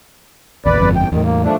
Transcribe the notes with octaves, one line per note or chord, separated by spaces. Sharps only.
A1 D#2 B4 D5
G1 F2 G#2
G5
E2 A2 D#3
A#3
F3 A3 D4